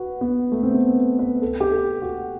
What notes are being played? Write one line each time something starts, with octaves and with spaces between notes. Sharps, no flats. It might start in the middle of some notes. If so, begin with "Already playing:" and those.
Already playing: F#4 B4
B3
A3
C4
B3
B4
A4
G4
A4
F#4